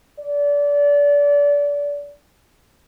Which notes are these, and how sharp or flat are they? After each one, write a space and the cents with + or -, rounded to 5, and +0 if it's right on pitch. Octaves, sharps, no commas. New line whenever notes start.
D5 -30